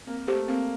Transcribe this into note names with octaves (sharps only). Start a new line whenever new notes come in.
A#3 C4
A3 G4 C5
A#3 C4